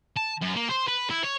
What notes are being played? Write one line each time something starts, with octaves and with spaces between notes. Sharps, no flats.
A5
F#2
A#3
C5
B4
E4
C#5